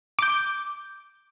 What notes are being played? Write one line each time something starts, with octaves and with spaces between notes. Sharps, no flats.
D6 G6